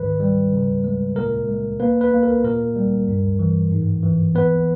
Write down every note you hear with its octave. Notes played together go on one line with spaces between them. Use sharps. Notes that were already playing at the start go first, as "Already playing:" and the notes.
Already playing: G#2 D#3 B4
G3
C#3
G#3
A#2 A#4
G#3
A#3 B4
B4
A#3
A#4
A#2 A#4
G3
G2
E3
G#2
E3
B3 B4